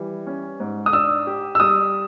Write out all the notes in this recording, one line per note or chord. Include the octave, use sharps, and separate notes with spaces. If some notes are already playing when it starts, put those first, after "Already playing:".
Already playing: E3 G3
C#4
G#2
D#6
D4 E6
G4
E6
G3 D#6